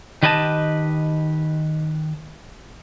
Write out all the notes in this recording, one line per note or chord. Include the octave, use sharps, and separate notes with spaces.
D#3 G4 B4 D#5 G#5 A5